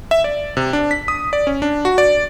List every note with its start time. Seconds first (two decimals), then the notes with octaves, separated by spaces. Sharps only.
0.11 E5
0.24 D5
0.57 C3
0.73 D4
0.91 B6
1.08 D#6
1.33 D5
1.47 C#4
1.62 D4
1.85 F#4
1.98 D5